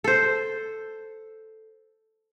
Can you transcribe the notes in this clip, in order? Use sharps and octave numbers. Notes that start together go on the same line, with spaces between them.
A4 C5